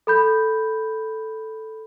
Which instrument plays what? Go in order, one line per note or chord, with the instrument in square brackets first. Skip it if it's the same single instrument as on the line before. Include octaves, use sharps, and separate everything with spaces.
[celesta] A4 B5 G6